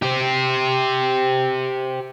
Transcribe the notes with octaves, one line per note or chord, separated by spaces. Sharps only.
G4 C5